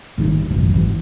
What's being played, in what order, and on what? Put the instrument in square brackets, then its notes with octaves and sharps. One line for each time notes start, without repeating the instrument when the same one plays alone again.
[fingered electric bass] D#1 G#1 D#3 G3
G#1 C#2 F#2 B2
G#1 E3